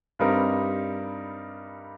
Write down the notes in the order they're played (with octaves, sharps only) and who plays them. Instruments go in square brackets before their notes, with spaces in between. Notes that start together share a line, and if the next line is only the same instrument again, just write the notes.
[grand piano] G2 G3 C4 D#4 A#4